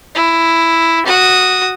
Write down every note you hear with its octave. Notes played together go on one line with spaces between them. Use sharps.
E4
F#4 D#6